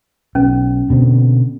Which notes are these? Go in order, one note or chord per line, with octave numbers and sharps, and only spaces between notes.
B1 C#4
B2 D3 C4